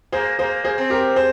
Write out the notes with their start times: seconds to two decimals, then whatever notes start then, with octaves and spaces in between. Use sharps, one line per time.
0.12 A#3 G#4 C5
0.39 A#3 G#4 C5
0.64 G#4 C5
0.78 C4
0.90 G4 A#4
1.16 G#4 C5